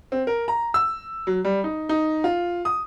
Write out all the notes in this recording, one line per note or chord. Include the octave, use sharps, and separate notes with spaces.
C4
A#4
A#5
E6
F#3
G3
D#4
D#4
F4
D#6